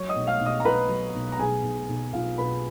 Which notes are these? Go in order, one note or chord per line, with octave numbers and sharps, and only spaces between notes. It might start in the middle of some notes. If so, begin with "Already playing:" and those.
Already playing: F#3 C#5 C#6
D#5 D#6
B1
F5 F6
B1
D#5 D#6
A#5
B1 B4 B5
F#3
B1
A#5
B1 G#4 G#5
B1
B1
B1 F4 F5
B2 B4 B5